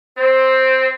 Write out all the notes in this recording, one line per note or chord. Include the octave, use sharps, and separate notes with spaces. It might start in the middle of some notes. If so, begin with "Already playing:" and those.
C4 C5